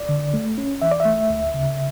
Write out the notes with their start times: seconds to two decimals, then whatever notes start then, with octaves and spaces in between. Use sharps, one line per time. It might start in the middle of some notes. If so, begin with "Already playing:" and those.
Already playing: D5
0.09 D3
0.34 A3
0.58 C#4
0.82 E3 E5
0.91 D5
1.00 E5
1.05 A3
1.30 D2
1.54 C#3